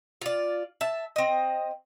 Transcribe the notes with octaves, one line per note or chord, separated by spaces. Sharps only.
F4 D5
E5 A5
C4 D#5